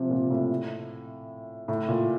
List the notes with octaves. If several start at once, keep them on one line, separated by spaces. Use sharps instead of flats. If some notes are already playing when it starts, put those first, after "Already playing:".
Already playing: C3 F3
A#2
A2
A2
A#2